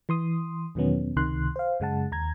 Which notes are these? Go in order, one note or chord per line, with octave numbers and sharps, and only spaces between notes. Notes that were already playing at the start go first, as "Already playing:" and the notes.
E3 C6 D#6
E2 B2 D#3 F#3 B3 C#4
C#2 C3 D#3 C6 F#6
C5 F5
F#2 C#3 G#3 F#5 A5
D#2 A#5 G#6